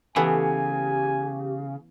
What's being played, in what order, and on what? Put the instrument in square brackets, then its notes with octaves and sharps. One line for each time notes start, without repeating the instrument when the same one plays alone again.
[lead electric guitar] C#3 [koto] E3 A3 B3 [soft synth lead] G4 [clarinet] G#5